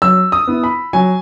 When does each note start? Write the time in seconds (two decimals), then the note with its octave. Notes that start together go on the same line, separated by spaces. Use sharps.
0.02 F#3 E6
0.32 D#6
0.47 B3 E4
0.64 B5
0.93 F#3 G#5